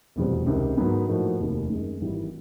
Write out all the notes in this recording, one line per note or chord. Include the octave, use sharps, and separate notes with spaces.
F1 E2 B2 G3 C4
C#2 C3 D#3
G#2 D#3 F#3 B3
A2 F3 A#3 D#4 F#4
F1 D#2 D#3
F#2 D#3 G#3
G#1 G#2 E3 G3